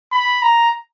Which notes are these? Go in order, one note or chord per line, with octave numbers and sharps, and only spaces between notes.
B5
A#5